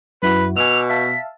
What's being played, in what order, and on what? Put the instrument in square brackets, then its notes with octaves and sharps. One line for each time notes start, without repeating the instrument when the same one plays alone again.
[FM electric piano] F#2 E4 F#4 [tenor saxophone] B4
[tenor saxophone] B2 [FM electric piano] G#5 D6 E6 [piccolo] F7
[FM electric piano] E5 F5 A5 [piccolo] B6